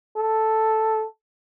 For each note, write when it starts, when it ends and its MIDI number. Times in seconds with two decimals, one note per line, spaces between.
0.17 1.05 69